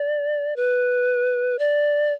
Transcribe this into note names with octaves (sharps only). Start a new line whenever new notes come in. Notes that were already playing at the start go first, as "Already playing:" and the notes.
Already playing: D5
B4
D5